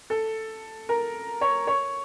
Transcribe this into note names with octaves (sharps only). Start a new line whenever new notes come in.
A4
A#4
C#5
C#5